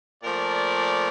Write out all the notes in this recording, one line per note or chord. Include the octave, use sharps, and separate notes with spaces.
A#2 F3 A3 A#4 D5